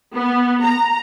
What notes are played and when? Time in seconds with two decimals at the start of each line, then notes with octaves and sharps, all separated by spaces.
0.15 B3
0.64 A#5